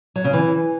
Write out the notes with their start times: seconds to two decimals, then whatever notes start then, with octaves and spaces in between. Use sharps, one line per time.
0.16 F#3
0.24 C#3
0.33 E3